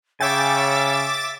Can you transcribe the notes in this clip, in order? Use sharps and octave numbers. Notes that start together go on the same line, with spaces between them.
C#3 C#5 E5 G5 G#5 D6 A6